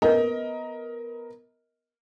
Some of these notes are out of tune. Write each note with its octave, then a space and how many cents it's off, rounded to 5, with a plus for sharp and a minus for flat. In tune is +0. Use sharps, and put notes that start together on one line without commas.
B3 +0 A#4 +0 D#5 +20